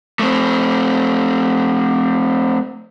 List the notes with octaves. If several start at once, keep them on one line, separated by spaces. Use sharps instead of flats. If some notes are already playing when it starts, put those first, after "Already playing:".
A3 C4